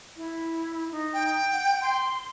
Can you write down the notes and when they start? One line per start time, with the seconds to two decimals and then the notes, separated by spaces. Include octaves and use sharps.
0.17 E4
0.91 D#4
1.14 G5
1.52 F#5
1.82 C6